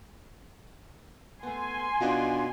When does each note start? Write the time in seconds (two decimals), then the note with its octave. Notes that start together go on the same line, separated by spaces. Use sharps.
1.43 A3 B3 G#5 C6
2.00 B2 D4 D#4 F4